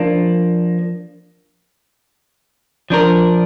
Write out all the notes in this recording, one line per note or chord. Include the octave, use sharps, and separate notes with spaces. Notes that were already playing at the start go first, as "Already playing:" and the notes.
Already playing: F3 A#3 D4
F3 D4 A#4